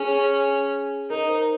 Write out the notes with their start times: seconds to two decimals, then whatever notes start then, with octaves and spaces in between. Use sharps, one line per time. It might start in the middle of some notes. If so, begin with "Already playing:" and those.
Already playing: C#4 G#4
1.10 D#4 A#4
1.29 C5